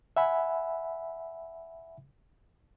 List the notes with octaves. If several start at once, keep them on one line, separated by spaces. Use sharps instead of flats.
E5 F#5 G#5 B5